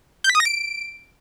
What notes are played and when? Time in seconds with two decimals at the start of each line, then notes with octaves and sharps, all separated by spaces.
0.24 G6
0.30 B6
0.35 D#6
0.40 A#6
0.45 D7